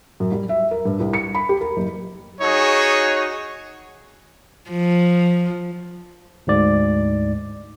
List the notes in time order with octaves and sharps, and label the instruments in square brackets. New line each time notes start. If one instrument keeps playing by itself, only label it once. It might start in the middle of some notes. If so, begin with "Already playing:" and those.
[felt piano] F#2
G3
E5
A#4
G2
C2
C#7
B5
G4
A#4
F#1
[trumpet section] D#4 F#4 G#4 C#5
[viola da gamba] F3
[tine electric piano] D2 G#2 D5